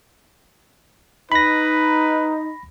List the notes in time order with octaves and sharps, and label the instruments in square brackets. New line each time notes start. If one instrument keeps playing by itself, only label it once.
[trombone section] D#4 [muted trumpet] B4 [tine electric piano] B5 A#6